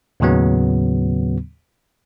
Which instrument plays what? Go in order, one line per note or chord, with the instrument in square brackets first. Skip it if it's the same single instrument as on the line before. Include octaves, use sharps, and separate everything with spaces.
[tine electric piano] D#2 A2 C#3 F#3 B3